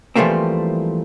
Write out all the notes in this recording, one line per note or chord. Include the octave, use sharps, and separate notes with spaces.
E3 F3 G3 A3 A#3 C4